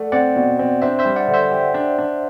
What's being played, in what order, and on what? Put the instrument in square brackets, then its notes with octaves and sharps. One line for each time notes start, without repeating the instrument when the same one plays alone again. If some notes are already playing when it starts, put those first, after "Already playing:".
Already playing: [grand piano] A3 [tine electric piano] D5 F#5
[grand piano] C4 [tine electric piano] D5 F#5
[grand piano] B2
C4
[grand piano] D4 [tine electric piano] C5 E5
[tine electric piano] C5 E5
[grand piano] G3
[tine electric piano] D5 F#5
[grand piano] D3
[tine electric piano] C5 E5
[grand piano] G4
D4
D4